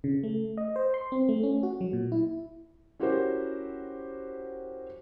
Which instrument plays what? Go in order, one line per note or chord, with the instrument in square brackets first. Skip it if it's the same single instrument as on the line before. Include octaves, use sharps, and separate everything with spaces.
[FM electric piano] C#3
A3
D#5
C5
C6
C4
A3
C#4
F#4
F#3
A#2
E4
[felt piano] C#4 E4 F#4 G4 A#4 C5